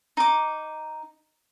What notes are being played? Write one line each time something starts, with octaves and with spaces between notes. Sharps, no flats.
D#4 D6